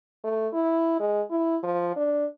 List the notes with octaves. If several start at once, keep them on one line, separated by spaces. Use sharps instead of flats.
A3
E4
G#3
E4
F3
D4